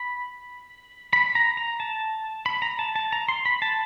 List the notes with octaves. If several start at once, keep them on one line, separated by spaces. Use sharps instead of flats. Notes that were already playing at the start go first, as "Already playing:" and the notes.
Already playing: B5
B5
A#5
A#5
A5
B5
A#5
A5
A5
A#5
C6
B5
A5